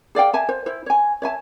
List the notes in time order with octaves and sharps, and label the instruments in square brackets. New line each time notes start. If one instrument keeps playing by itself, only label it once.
[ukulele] G#4 D5 F5 G5
E5 G#5 A5
C5
E4 C5
C#5 G#5
C#5 E5 G#5 A5